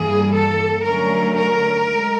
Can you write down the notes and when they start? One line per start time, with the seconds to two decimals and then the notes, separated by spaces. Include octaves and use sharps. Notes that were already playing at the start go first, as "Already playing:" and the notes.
Already playing: G2 E3 G3 A#3 G#4
0.31 A4
0.83 D3 F#3 A3 C#4 A#4
1.35 A#4
1.88 G#3